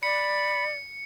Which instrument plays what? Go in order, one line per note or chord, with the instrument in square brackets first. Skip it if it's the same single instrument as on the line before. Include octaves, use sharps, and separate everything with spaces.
[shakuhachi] D5 [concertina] B5 [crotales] C#7